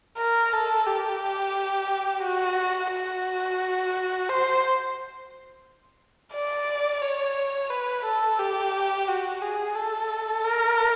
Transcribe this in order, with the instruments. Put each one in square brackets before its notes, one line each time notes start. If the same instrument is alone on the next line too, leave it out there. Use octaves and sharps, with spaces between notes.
[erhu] A#4
A4
G4
F#4
F#4
C5
D5
C#5
B4
A4
G4
F#4
G#4
A4
A#4